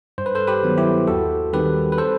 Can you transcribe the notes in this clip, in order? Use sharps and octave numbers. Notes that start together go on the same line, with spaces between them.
G2 C5
B4
A4 C5
G4 B4
D#3 F#3 B3
E4 G4
D#2 F#4 A4
D#3 G3 C4 G4 B4
B4
A4 C5